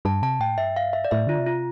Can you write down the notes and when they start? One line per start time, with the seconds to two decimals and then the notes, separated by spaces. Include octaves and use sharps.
0.05 G2 A5
0.22 C3 A5
0.40 A2 G5
0.58 G2 E5
0.76 F5
0.93 E5
1.05 D5
1.11 A2 E5
1.27 D3 F4
1.39 C3
1.47 F4